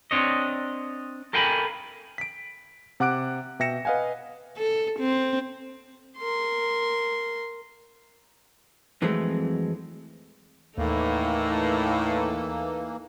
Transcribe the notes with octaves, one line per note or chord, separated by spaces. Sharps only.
C4 D4 C#5 D#5
A4 A#4 F5 G5 G#5 B5
B6 D7
C3 F#5 D6 F#6 D7
B2 E5 G5 A#6 C#7 E7
B4 D#5 F5 F#5 G#5
A4
C4
A#4 C6
F2 E3 F#3 G#3 A3 C4
D#2 A2 E3 A#3 D#4 A4